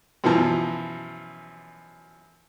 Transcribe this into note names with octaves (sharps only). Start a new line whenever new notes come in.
F#2 B2 E3 F3